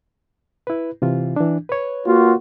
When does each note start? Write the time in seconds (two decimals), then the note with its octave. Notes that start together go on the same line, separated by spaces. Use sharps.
0.67 E4 B4
1.02 C3 E3 F4
1.36 E3 D4
1.69 B4 C#5
2.07 A#3 F4 F#4